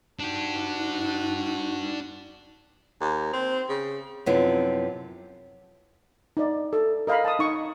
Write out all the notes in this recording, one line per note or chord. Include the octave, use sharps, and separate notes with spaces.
D4 D#4 F#4 G4 A5
D#2
C4
C#3
F#2 C3 F3 B3 D#4 E4
D#4 D5
A4
A#4 D#5 F5 A#5 B5
A5 D#6
D#4 C#6